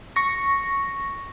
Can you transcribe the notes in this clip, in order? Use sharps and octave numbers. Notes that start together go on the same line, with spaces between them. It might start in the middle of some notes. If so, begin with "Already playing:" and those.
C#6 A#6